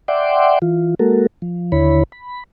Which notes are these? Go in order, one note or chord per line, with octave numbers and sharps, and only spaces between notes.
D5 E5 F#5 G5 C6 D6
E3 F4
G#3 A#3 F#4 A4 A#4
F3
D#2 D3 E4 C#5 B5
B5